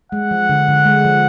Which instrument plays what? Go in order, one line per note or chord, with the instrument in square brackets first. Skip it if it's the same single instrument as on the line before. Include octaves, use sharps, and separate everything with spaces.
[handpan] G#3 [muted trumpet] F#5
[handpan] F3
D3
D3
G#3
F3